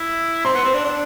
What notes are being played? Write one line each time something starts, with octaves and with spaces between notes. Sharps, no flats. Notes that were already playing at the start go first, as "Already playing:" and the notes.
Already playing: E4
C4 C6
B3
C4
D4
D4